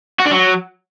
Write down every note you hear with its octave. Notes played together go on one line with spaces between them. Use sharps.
F#4
D4
F#3